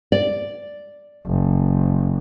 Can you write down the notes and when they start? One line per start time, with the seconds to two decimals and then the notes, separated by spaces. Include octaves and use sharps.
0.12 D5
1.26 F#1